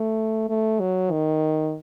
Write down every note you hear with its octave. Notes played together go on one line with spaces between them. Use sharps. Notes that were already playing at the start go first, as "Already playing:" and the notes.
Already playing: A3
A3
F#3
D#3